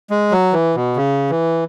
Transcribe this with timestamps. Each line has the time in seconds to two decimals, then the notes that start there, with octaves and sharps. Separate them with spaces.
0.10 G#3
0.32 F#3
0.53 E3
0.75 B2
0.96 C#3
1.30 E3